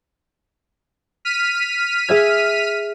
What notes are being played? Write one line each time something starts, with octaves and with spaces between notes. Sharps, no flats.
F6 B6 D#7
G#4 E5 G#6